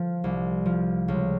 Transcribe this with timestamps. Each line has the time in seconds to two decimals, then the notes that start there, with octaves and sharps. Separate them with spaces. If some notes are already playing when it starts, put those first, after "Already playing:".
Already playing: F3
0.24 C2
0.66 F3
1.08 C#2